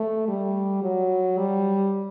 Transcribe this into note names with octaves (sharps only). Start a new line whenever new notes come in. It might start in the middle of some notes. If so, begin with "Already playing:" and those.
Already playing: A3
G3
F#3
G3